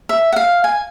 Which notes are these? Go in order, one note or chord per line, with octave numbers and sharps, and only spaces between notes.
E5
F#5
F5
G#5